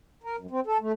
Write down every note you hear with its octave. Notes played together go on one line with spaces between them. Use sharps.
A#4
F#2
C4
A4
A3